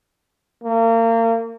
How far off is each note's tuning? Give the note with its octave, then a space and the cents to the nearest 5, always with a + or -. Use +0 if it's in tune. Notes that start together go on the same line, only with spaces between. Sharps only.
A#3 -35